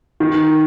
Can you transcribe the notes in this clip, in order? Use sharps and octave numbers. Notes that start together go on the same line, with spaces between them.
D#3